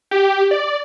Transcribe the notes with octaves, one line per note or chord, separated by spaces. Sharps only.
G4
D5